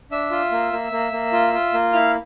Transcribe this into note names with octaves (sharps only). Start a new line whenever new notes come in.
D4 E5 E6
F4
A#3
A#3
A#3
A#3
F4
F4
A#3
E4 F5 F6